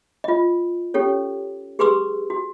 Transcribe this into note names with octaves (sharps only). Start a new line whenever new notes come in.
F4 D#5
C#4 G4 A4 C#5
G4 G#4 B4 C6 D6 E6
F#4